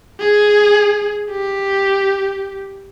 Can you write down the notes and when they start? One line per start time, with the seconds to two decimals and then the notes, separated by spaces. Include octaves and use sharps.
0.20 G#4
1.31 G4